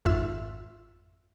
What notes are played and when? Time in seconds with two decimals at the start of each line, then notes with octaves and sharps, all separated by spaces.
0.05 G#1 F2 G#2 F4 E5 E6